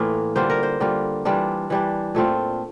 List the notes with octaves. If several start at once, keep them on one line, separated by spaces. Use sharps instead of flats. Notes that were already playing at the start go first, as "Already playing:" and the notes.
Already playing: A2 E3 A#3 F4
D3 G3 A#3 F4 C5
A#4
C5
D3 G3 A#3 F4
E3 G3 D4 F4
E3 G3 D4
A#2 A3 C4 F4